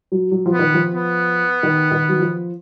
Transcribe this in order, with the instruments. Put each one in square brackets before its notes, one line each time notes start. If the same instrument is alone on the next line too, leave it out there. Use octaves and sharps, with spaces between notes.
[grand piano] F#3
F#3
F3
[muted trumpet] B3
[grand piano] D#3
F3
[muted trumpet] B3
[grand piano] D#3
D#3
F#3
F3